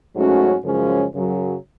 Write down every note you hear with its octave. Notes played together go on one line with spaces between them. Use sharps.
G#2 F#3 A3 C#4 F#4
F#2 C#3 F3 G#3 C#4
F#2 C#3 F#3